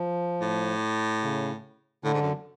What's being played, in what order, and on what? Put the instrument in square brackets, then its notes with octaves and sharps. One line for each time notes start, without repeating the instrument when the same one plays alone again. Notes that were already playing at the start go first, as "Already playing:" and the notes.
Already playing: [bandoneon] F3
[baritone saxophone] A2
[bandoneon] C#3
[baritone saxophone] A2 [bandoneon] D3
[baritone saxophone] G#2
F#2